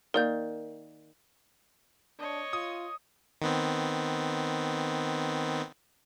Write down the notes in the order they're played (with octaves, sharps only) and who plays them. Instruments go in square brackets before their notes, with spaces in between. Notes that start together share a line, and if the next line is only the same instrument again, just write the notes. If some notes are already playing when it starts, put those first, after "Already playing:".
[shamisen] D#3 A#3 [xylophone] A#4 D5 G6
[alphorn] D4 [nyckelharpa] C#5 D#5
[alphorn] F4 [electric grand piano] D#6
[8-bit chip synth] D#3 B3 C4